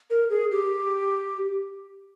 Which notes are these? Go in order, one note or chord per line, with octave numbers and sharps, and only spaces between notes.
A#4
G#4
G4